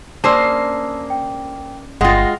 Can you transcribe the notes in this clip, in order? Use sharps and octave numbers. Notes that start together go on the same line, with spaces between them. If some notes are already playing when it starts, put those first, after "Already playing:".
A#3 C#4 D4 G#4 C5 A5 E6
G5
G1 G#3 F4 F#5 G5 A#6